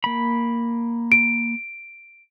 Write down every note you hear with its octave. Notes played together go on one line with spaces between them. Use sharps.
A#3 B5
D7